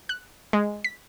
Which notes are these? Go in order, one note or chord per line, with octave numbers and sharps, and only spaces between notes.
F#6
G#3
B6